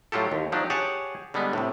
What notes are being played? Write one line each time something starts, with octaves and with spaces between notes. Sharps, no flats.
A2 F#3 F4 G4 A4
D#2
F3 F#3 D4 D#4 G4
G4 G#4 C#5 F#5 A5
D3 G3 G#3 B3
A2 C3